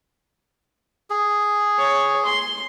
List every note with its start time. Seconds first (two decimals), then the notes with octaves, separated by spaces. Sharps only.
1.10 G#4
1.78 C#5
2.25 C6